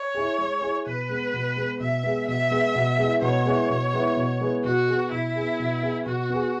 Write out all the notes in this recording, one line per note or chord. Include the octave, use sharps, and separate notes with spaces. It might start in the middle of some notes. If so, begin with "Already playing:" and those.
Already playing: C#5
E4 G#4
G#3
E4 G#4
B2 B4
G#3 B3
B2
G#3 B3
B2 E5
G#3 B3
B2 E5
G#3 B3
B2
G#3 B3 E4
B2 C#5
G#3 B3 E4
B2
G#3 B3 E4
B2
G#3 B3 E4
B2 F#4
B3 G#4
B2 E4
B3 G#4
B2
B3 G#4
B2 F#4
B3 G#4